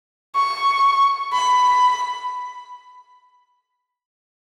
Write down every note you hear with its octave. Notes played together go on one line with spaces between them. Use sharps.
C#6
B5